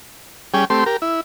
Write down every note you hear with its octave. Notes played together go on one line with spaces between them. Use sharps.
G3 C#4 G#4 G5
A3 C4 G4 C6
G4 A#4
E4